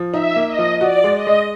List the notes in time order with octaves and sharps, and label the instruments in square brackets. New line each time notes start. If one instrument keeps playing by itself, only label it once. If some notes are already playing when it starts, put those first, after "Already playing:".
Already playing: [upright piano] F3
[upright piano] D#4 [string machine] E5
[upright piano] A#3
[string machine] D#5
[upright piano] F3
[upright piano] F#4 [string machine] D5
[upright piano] G#3
[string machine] D#5
[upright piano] G#3